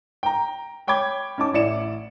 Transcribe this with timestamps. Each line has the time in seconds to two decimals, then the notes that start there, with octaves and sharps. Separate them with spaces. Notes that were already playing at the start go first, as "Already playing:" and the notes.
0.23 G5 A#5
0.87 C#5 G5 B5 D6 G#6
1.38 C#4 D#4 A5 D6
1.53 A1 E4 D5 C#7 E7